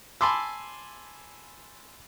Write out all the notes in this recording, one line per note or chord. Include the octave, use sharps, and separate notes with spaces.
G#5 A5 B5 C6 D6 E6